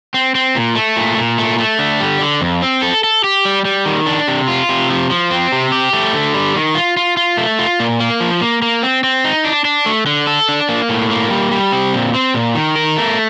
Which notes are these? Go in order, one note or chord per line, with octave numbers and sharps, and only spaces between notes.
C4
C4
A#2
A3
A#2
A#2
A3
A3
D3
G3
D3
F2
C4
A4
A4
G4
G3
G3
D#3
D4
C3
F4
C3
F3
F3
C4
C3
G4
A3
D3
G3
D#3
F4
F4
F4
A3
F4
A#2
A#3
F3
A#3
A#3
C4
C4
D#4
D4
D4
A3
D3
A4
D4
A#3
A2
A#3
G3
G3
C4
A#2
C4
A#2
D#3
A#4
A3